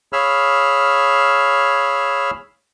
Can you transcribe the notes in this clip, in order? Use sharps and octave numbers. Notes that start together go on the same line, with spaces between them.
G#4 C#5 F5 B5 E6 F6